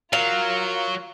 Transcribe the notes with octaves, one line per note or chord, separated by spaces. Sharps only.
F#3 F4 A#4 F5